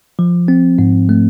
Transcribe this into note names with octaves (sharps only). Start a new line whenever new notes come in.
F3
C4
G#2
A3